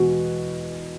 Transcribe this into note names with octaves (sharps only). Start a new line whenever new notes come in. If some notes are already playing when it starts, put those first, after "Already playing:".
Already playing: E2 B2 G#3 B3 F#4